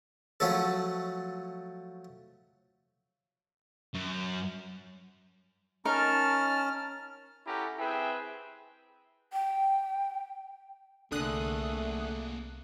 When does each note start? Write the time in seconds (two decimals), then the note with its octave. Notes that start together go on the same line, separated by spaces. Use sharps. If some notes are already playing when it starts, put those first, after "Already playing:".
0.40 F3 F#3 A3 C#4 A4
3.94 F#2
5.85 C#4 D#4 A#4 A5 F6
7.47 C#4 E4 G4 A4 F#5 A#5
7.79 C4 E4 G#4 B4 E5 G5
9.33 G5
11.12 C2 D3 A3 A#3 G#4 D#6 F#6